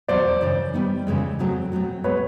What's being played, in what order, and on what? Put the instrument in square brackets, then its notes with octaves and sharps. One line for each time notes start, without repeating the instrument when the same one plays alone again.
[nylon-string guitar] E2 B2 F#3 [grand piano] C5 D5
[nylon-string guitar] F#2 C#3 E3
D#3 G3 B3 D#4
F2 C#3 E3 G#3
F2 C#3 F#3 A3 C4
B2 F#3 A3 C4
[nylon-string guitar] B2 G#3 B3 [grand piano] B4 C#5